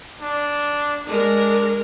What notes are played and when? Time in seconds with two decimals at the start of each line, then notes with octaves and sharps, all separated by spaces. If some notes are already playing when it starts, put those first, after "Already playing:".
0.21 D4
1.06 G#3 D4 A#4